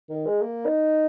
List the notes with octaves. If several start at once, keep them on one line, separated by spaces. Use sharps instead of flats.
D#3
G#3
A#3
D#4